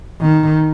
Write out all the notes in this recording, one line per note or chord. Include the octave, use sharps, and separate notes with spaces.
D#3